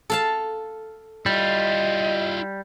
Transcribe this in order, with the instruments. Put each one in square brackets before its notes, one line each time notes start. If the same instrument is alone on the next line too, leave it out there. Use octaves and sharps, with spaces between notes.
[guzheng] A4 F5 A5
[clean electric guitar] G3 [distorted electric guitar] E4 F4 [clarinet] D#5